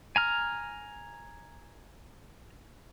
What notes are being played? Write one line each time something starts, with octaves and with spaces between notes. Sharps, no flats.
G#5 A#5 F6